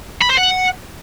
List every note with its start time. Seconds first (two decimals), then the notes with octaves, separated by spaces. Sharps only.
0.22 B5
0.30 C5
0.38 F#5